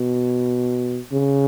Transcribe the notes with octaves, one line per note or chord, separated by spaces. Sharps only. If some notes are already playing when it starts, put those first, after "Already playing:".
Already playing: B2
C#3